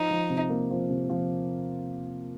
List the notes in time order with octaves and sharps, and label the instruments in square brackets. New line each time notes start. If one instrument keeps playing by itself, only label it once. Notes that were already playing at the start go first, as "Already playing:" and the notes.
Already playing: [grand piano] F3 [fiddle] D#4
[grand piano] F3
C3
A#3
F3
C3
F3